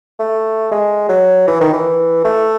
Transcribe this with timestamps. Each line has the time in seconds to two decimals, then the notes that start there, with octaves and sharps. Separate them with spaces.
0.19 A3
0.71 G#3
1.09 F#3
1.47 E3
1.61 D#3
1.73 E3
2.25 A3